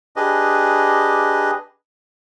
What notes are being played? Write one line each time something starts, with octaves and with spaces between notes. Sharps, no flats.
D4 G4 G#4 B4 D#5